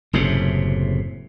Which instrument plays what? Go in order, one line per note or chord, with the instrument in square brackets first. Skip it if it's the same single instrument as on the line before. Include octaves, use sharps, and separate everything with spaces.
[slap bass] F#1 F#2 A2 C3